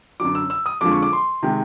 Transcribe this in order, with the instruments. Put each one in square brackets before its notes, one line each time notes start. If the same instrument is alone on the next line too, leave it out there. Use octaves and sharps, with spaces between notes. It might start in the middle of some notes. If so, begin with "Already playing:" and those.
[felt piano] F#2 D3 F#3 D6
E6
E6
D#6
F2 D3 F3 G#3 D6
C#6
D6
C6
C3 D#3 G#3